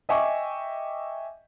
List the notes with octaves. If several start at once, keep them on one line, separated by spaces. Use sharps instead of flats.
D#5 E5 G5 G#5 C#6 D6